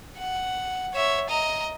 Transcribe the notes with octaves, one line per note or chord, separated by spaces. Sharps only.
F#5
C#5 E5
D#5 A#5